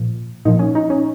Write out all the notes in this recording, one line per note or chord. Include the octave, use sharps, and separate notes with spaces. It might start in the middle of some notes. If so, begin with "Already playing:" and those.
Already playing: A#2 F3
A#2 F3 D#4
C#4
D#4
C#4